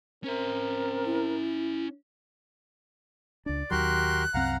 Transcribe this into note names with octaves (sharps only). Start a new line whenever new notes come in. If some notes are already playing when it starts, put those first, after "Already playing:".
C4 C#4 A#4 E5
E4
C#2 D4 D5
D#2 D#3 F#3 F#4 G4 A#4 C6 F#6
C2 F#2 C4 F5 F#5 A#5